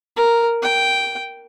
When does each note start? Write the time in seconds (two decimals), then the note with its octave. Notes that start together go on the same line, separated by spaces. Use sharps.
0.16 A#4
0.62 G5